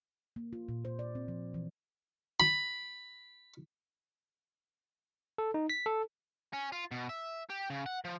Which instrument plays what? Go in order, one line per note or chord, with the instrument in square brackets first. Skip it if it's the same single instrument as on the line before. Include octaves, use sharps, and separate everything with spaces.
[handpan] A#3
F4
A#2
C5
D5
C4
F3
E3
[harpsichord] B5
[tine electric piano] A4
D#4
B6
A4
[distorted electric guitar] C#4
F4
B2
E5
G4
C#3
F#5
F3